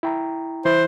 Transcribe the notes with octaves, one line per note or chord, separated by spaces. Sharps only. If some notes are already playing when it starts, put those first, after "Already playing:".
E4 G5 A#5
E3 E4 C5 F#6